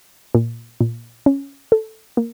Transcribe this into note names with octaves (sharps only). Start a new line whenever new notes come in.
A#2
A#2
C#4
A4
A#3